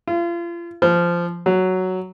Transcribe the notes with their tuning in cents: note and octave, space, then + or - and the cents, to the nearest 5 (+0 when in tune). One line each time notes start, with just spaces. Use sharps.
F4 -35
F3 -15
F#3 +5